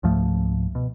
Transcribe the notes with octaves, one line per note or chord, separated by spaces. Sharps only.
C#2 G#2 F3 A3
B2